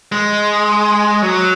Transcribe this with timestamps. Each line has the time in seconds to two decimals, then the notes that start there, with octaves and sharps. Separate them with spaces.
0.12 G#3
1.22 F#3